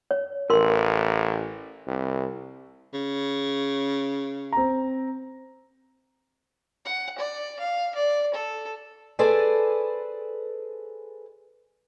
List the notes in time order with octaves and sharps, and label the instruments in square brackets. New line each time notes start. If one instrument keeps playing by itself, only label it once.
[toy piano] C#5
[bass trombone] A1 [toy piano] A#4 C6
[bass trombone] C2
[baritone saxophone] C#3
[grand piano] C4 A#5
[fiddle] F#5
D5
F5
D5
A4
[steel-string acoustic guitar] G#4 A4 B4 C5 D5 G#5